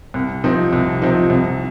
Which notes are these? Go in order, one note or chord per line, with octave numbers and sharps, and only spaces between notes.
C2
C3 F3 C4 D#4
C2
C3 F3 C4 D#4
C2